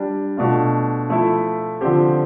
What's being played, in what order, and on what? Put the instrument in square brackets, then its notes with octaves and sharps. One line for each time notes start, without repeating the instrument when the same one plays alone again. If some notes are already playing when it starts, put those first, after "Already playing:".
Already playing: [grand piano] G3 D4 G4
B2 A3 D4 F4
F3 A3 E4
D3 F3 C4 G4